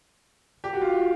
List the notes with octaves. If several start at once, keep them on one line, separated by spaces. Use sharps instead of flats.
G4
F#4
F4